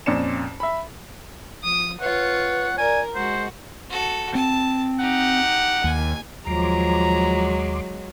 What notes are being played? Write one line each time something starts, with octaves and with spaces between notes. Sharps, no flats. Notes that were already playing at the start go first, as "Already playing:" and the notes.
F2 A#2 C#4 D5 C#7 E7
E5 B5
F3 D#6
F4 B4 C#5 F#5
A#4 D5 G#5
G#3 F#4 C5
F#4 A4
C4 A5
D#4 G4 F#5
D#2 G#5
D#2 F3 F#3 G#3 A#5 C6 D6